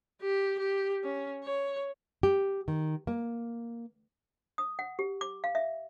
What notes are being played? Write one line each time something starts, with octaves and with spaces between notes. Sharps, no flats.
G4
G4
C#4
C#5
G4
D#3
A#3
D#6
F#5
G4
D6
F5
E5